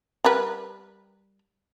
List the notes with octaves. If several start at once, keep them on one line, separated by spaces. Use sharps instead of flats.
G3 A#4 B4